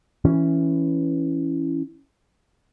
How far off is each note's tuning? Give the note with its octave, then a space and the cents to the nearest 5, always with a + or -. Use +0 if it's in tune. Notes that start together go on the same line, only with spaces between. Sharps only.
E3 +0 C#4 +0